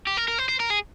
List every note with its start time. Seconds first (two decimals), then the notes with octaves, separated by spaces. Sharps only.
0.07 G4
0.17 A#4
0.28 A#4
0.39 C5
0.49 C5
0.60 A#4
0.70 G#4